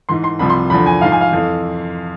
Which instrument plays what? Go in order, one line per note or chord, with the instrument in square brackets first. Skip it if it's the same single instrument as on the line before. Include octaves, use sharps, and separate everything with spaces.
[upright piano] G#2 E3 C6
C6
C2 C3 F3 B5
C6
E2 D3 F3 B5
G#5
G#2 F3 F5
G#5
F5
F2 E3